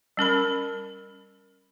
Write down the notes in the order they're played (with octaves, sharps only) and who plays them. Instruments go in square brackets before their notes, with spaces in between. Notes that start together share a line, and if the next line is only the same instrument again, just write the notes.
[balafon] G3 C#4 A#4 B5